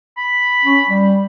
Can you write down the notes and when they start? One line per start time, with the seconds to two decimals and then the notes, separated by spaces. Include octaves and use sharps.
0.17 B5
0.64 C#4
0.88 G3